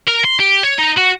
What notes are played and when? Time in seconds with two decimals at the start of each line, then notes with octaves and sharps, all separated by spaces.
0.08 A#4
0.25 C6
0.40 G4
0.64 C#5
0.79 D#4
0.98 F#4